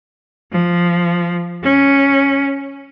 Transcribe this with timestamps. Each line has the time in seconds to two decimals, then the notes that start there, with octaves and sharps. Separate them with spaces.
0.52 F3
1.63 C#4